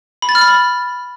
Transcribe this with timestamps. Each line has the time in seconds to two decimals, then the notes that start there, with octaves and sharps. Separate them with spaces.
0.22 B5
0.29 A6
0.35 F6
0.41 B5